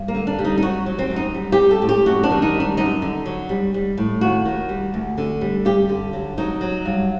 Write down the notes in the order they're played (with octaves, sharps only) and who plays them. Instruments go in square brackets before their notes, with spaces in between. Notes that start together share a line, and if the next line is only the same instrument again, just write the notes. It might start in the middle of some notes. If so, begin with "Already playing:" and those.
Already playing: [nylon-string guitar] G2
A#3
D3
D4
G3
D#4
D#4
F#3 F#4
F#3
C4
F#2
D#4
G3
G4
G3
A4
A2
G4
F#2 F#4
D4
D#3
D#4
G3
D4
F#2 D#4
D3
F#3
G3
G3
A2
D#2 F#4
D#3
G3
D2
D3
G3
G2 G4
D3
F#3
F#3 D#4
F#3
G2